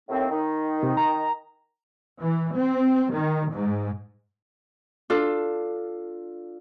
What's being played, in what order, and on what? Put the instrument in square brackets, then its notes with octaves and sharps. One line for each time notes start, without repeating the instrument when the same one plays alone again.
[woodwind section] D#2 A2 C4
D#3 D#4
[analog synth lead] C3
A#5
[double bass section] E3
C4
D#3
G#2
[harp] D4 F4 A4